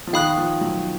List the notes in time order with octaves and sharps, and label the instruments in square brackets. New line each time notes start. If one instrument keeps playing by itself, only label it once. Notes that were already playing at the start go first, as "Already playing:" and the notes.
[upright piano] F3
[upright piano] D#3 [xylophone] F5 B5 D#6 F#6
[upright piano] F3
F#3